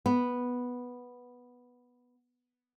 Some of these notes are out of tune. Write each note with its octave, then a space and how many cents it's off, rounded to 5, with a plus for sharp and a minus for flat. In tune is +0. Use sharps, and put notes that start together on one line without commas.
B3 -5